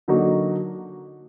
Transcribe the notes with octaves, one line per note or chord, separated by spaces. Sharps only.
D3 F#3 A#3 D#4 F#4